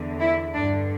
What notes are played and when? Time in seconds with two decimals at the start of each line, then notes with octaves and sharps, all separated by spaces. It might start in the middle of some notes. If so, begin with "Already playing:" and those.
Already playing: E2 D3
0.19 E4
0.53 G2 D3 D4